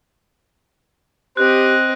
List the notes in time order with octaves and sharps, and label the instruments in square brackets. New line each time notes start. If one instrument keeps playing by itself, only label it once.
[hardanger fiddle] C4 D#5 [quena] G4 [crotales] F#6